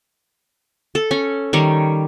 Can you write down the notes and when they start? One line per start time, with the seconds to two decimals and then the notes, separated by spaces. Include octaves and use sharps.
0.95 A4
1.11 C#4
1.53 D#3 G3 C#5